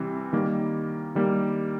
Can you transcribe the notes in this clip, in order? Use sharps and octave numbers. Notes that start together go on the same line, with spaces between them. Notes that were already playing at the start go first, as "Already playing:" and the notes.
Already playing: C3 E3 G3 C4
D#3 G3 A#3
D#3 G3 A#3